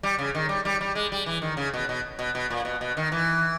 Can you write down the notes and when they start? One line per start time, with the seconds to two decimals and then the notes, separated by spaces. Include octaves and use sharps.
0.03 G3
0.19 C#3
0.35 D#3
0.49 G3
0.65 G3
0.81 G3
0.95 G#3
1.12 G3
1.26 E3
1.42 D#3
1.57 C#3
1.74 B2
1.89 B2
2.19 B2
2.35 B2
2.50 A#2
2.65 B2
2.81 B2
2.97 D#3
3.12 E3